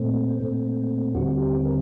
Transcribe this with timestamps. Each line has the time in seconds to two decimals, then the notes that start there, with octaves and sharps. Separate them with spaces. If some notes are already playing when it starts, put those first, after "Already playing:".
Already playing: A#2 A3 C4
0.40 A#2 A3 C4
1.14 D#2 D3 G3 C4 F#4
1.40 G4
1.65 A#4